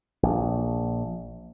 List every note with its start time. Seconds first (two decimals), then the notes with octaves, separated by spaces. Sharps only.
0.23 A#1